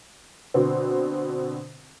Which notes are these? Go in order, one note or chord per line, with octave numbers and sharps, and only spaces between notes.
B2 D3 C4